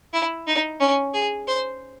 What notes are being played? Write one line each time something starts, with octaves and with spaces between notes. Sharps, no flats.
E4
D#4
C#4
G#4
C5